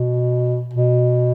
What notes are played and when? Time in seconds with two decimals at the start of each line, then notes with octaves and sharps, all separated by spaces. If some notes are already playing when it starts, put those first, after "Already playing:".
Already playing: B2
0.73 B2